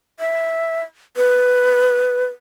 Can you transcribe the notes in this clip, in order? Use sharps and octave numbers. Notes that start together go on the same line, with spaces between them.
E5
B4